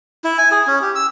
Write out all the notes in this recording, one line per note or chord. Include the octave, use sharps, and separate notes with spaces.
E4
G#5
G#4
C#4
G4
E6